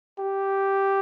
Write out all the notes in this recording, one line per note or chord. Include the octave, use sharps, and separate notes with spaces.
G4